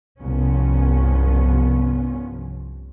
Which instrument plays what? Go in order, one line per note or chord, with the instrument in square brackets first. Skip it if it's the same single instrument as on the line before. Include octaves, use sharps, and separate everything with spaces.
[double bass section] C2 G2 F3 B3 C#4